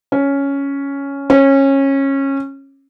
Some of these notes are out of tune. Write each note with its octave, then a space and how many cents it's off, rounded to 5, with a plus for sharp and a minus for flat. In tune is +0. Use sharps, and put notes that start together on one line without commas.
C#4 +5
C#4 -20